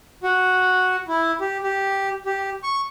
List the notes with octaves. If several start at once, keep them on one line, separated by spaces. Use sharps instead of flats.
F#4
E4
G4
G4
G4
C#6